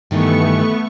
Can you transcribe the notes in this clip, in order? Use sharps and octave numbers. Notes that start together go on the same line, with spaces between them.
G2 D#3 E3 A3 B3 C#6